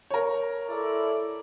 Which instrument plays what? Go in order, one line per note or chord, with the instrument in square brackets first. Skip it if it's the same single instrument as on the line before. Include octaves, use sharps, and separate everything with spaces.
[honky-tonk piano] A#4 C#5
[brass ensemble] E4 A4 D5